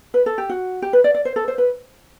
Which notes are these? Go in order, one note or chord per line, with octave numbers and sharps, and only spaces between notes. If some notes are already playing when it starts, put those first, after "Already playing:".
B4
A4
G4
F#4
G4
B4
D5
D5
C5
A4
C5
B4